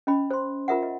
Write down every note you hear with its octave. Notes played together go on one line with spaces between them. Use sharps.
C#4 D#5 B5
C5 C6
F4 A#4 E5 F#5
D#5